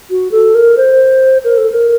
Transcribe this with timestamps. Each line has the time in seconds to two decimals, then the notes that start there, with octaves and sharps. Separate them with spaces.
0.10 F#4
0.32 A4
0.55 A#4
0.77 C5
1.44 A#4
1.58 A4
1.72 A#4